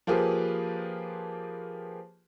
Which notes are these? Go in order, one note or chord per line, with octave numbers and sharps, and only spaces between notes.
F3 A#3 F4 G4 G#4 B4